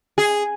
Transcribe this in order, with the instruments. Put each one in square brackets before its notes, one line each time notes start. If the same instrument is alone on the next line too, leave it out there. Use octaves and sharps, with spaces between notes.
[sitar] G#4